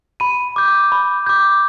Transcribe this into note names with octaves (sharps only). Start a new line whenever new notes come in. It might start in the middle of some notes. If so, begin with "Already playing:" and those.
B5 D#7
D6 G6
B5
D6 G6